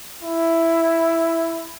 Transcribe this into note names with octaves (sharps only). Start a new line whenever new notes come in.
E4